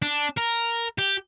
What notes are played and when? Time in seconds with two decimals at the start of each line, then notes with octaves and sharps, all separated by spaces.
0.02 D4
0.37 A#4
0.98 G4